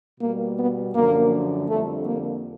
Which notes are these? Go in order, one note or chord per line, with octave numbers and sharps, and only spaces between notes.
B2 G3 A#3
B3
F#2 D3 F3 A#3
F2 D3 G3 A3
A#3